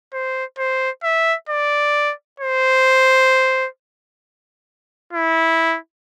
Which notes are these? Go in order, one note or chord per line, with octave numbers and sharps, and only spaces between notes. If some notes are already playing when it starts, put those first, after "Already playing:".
C5
C5
E5
D5
C5
E4